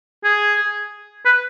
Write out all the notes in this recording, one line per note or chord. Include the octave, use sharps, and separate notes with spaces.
G#4
B4